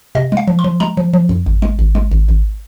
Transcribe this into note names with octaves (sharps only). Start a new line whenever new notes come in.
C3 D#5
G#3 F5
F3
C6
F3
G#3 A#5
F3
F3
F2
G#1
G#3
G#1
G#3
G#1
G#1